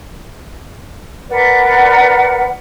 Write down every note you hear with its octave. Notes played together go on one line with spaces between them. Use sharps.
A#4 B4 D5 F#5